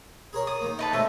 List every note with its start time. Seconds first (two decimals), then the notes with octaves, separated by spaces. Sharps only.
0.33 G#4 A#4 C#5
0.47 D#6
0.61 D#3 A#3
0.79 D#4 B4 A5
0.93 C3 G#3 A3 C#4